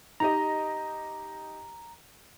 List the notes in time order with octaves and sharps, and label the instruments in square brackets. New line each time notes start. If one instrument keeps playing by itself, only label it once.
[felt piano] D#4 G4 D#5 [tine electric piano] A#5